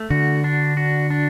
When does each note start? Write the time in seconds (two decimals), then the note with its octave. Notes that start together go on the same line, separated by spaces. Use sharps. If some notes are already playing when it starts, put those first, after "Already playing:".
Already playing: A3
0.10 D3 F#4
0.44 D4
0.77 F#4
1.10 D4